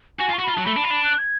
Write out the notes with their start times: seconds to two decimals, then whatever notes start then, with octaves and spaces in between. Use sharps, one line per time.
0.19 F#4 G#5
0.29 F4
0.33 F#4 C#6
0.44 F4 B5
0.54 F#3 A5
0.64 A3 B5
0.76 D4
0.84 F4
0.90 D4
1.04 F#6
1.18 G#6